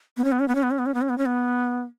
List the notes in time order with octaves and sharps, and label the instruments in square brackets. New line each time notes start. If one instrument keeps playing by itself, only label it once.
[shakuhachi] B3
C#4
B3
C#4
B3
C#4
B3
C#4
B3
C#4
B3
C#4
B3
C#4
B3